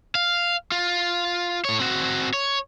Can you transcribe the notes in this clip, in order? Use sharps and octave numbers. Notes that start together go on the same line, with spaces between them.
F5
F4
A2 C#5
C4 F#4
C#5